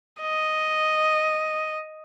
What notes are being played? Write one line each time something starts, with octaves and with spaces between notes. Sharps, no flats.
D#5